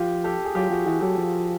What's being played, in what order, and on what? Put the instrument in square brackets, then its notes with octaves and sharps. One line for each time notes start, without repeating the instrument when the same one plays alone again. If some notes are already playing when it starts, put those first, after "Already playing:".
Already playing: [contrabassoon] F3 [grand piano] F4 G4
[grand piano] G4 A4
G#4
[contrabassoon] F#3 [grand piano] F4 G4
[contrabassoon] F3 [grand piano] F#4 G#4
[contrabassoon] E3 [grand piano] F#4 G#4
[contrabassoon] F#3 [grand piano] G4 A4
[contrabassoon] F3